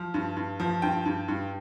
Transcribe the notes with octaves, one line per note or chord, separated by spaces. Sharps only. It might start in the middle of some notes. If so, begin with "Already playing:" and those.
Already playing: F3 F6
G2
G2
F3
G2 G5
G2
G2